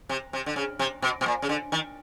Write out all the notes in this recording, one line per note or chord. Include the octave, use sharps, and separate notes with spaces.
C3
C3
D3
C#3
C3
B2
B2
A#2
C#3
D3
D#3